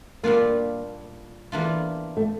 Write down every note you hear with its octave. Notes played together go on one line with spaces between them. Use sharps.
A#2 G3 A#3 D4 F4
E2 E3 A#3 D4 F4
A3